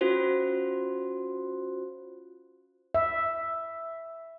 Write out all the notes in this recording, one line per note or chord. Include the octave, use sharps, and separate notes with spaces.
C#4 F4 F#4 C5
E5